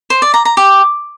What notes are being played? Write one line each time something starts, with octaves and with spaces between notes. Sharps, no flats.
C5
D5
A#5
A#5
G4